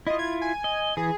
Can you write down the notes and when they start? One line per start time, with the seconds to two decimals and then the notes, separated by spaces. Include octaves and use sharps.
0.07 E4 F4 D#5
0.19 G#6
0.41 G#5
0.64 D#5
0.97 E3 G#4